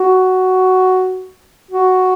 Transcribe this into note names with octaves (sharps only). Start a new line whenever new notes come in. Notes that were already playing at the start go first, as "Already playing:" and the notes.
Already playing: F#4
F#4